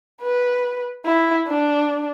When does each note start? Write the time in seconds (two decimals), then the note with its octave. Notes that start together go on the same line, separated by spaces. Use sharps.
0.22 B4
1.05 E4
1.48 D4